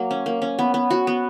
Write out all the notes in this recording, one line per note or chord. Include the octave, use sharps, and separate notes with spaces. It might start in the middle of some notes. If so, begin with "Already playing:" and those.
Already playing: F#3 A#3
C#4
A#3
C#4
B3
B3
F#4
B3